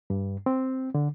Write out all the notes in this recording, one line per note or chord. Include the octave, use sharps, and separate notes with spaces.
G2
C4
D3